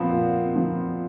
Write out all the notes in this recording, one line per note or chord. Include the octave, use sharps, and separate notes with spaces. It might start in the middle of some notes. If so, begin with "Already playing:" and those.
Already playing: A#2 F3 B3 C4
A#2
F3